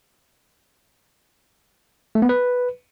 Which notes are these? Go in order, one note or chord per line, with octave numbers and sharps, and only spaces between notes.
A3
B3
B4